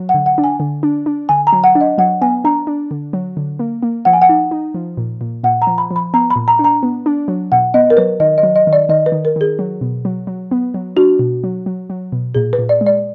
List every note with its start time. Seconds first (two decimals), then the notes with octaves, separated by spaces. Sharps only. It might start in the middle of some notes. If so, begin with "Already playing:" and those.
Already playing: F#3
0.09 F#5
0.14 D3
0.26 F#5
0.38 D4
0.44 G#5
0.60 D3
0.83 D4
1.06 D4
1.29 D3 G#5
1.47 A#5
1.53 F#3
1.64 F#5
1.75 D4
1.81 D#5
1.98 F#3 F#5
2.21 B3 G#5
2.44 D4 A#5
2.67 D4
2.91 D3
3.13 F#3
3.37 D3
3.59 A#3
3.83 A#3
4.05 F3 F#5
4.13 G#5
4.22 F#5
4.29 D#4
4.51 D#4
4.75 F3
4.97 A#2
5.21 A#2
5.43 A#2 F#5
5.62 A#5
5.67 F3
5.78 B5
5.91 F3
5.96 B5
6.14 B3 A#5
6.30 B5
6.36 A#2
6.48 A#5
6.59 D4
6.64 A#5
6.83 B3
7.06 D4
7.28 F#3
7.52 B2 F#5
7.74 B3 D#5
7.90 A#4
7.97 F#3 B4
8.20 D#3 D#5
8.38 D#5
8.43 F#3
8.56 D#5
8.67 D#3
8.73 D5
8.89 D#3 D#5
9.06 B4
9.12 D#3
9.25 A#4
9.36 D#3 G#4
9.59 F#3
9.81 B2
10.05 F#3
10.27 F#3
10.51 B3
10.74 F#3
10.96 D4 F#4
11.19 B2
11.44 F#3
11.66 F#3
11.90 F#3
12.12 B2
12.35 A#2 G#4
12.53 B4
12.59 A#2
12.69 D5
12.81 G#3
12.87 D5